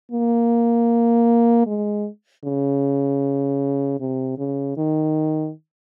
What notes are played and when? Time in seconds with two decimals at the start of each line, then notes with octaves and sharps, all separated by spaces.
0.11 A#3
1.66 G#3
2.45 C#3
4.00 C3
4.38 C#3
4.77 D#3